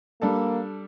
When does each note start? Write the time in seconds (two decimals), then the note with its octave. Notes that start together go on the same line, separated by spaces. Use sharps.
0.21 G3 A#3 D4 A4